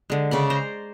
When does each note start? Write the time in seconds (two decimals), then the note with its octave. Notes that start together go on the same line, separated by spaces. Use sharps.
0.10 D3 G#3
0.31 C#3 D5 B5
0.50 C5 A#5